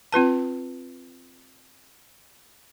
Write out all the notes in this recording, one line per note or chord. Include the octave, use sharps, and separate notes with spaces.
C4 F4 B4 A5